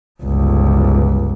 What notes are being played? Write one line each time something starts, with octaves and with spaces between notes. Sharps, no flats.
G1 C#2